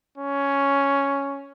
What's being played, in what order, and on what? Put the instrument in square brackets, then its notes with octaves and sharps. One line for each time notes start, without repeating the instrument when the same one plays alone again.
[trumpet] C#4